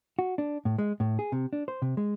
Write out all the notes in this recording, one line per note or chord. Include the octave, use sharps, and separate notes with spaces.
F#4
D4
A2
G#3
A2
G#4
C3
D4
C5
C3
G#3